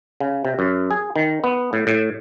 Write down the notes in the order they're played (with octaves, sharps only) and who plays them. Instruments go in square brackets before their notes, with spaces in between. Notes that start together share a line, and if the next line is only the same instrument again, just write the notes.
[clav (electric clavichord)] C#3
C3
F#2
G#4
D#3
B3
A2
A2